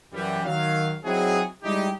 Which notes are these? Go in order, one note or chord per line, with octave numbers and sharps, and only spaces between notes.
F#2 E3 G3
D#3 F#3 F5
F#3 C4 D#4 E4 F#4 G#4
G3 G#3 D#4 E4 G4